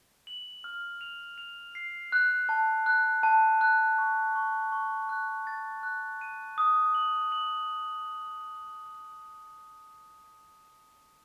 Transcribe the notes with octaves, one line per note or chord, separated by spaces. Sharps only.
F#7
F6
F7
F7
C7
F#6
A5
F#6
A5
F#6
C#6
C#6
C#6
F#6
A6
F#6
D#7
D#6
F#7
F#7